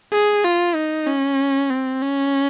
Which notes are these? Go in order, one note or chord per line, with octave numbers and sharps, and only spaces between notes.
G#4
F4
D#4
C#4
C4
C#4